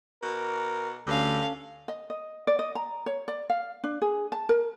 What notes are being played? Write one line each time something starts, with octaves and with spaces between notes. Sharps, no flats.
B2 A#4
D2 G2 C#4 A4 F5
D#5
D#5
D5
D#5
A#5
C#5
D5
F5
D4
G#4
A5
A#4